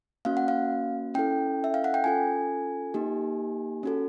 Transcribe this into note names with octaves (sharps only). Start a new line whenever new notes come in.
A#3 C#4 F#4 F5
F#5
F5
C#4 E4 A4 G5
E5
F5
F#5
G5
C#4 F4 A4 G#5
A#3 D#4 G4
C#4 F#4 A4